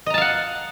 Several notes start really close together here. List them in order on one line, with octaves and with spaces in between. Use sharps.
D#5 A#5 A5 F5 F#5